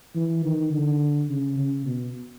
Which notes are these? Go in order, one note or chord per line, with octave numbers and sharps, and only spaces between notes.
E3
D#3
D3
C#3
C#3
B2